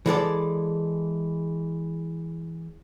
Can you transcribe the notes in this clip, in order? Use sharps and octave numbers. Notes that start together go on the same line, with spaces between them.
E3 G#3 A4 D5